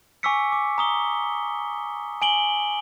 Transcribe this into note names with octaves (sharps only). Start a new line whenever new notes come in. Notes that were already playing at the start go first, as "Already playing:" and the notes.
G#5 C#6 D6 E6 B6 C#7
D6
A#5 D#6 G7
G#5 D7 F#7 G7